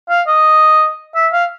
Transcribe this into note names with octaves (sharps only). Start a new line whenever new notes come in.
F5
D#5
E5
F5